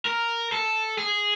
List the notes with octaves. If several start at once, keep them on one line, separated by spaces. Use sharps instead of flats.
A#4
A4
G#4